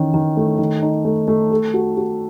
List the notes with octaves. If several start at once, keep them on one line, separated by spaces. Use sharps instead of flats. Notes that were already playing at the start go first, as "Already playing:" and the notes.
Already playing: D#3 E3 C#4
D#3
A3
D#3
D#4
A3
A3
A4
F#4
F#4